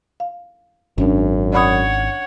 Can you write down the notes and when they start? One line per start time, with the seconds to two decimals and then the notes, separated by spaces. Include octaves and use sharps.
0.20 F5
0.98 G#1 F#2 C#4 D4
1.53 C#5 D5 F#5 B5 D#6